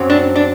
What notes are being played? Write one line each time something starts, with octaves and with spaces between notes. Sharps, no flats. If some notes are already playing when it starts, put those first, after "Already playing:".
Already playing: F#2 F#3 C4
D4
D4